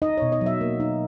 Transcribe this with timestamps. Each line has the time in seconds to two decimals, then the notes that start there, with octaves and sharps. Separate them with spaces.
0.02 D#4 D#5
0.17 B2 C#5
0.32 D#5
0.41 F#3
0.46 E5
0.61 A#3
0.80 D#4